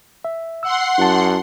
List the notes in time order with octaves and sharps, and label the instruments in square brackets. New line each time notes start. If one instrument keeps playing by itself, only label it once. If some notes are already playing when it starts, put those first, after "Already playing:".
[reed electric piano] E5
[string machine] F#5 C6 [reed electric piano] E6
[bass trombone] F#2 [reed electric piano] E4 A5